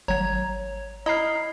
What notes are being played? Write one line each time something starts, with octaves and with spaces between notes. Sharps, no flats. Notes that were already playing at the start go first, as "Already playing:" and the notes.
G#1 F#3 C#5 A#5 G#6
E4 D#5 A#5 D#6 F6 C7